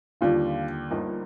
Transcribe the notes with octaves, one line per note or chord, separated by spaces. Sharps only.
D#2 D3 G3 D4 F4
G1 G2 F3 A#3 D#4